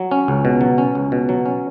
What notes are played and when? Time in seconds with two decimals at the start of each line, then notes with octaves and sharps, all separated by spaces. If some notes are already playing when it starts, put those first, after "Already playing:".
Already playing: F#3
0.11 C#4
0.28 C#2
0.45 B2
0.61 F#3
0.78 C#4
0.95 C#2
1.12 B2
1.29 F#3
1.46 C#4